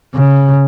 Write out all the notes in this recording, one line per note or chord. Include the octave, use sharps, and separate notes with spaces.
C#3